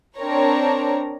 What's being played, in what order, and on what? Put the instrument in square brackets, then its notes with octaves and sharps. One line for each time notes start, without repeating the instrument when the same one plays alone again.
[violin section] C4 D4 A#4 C#5 A#5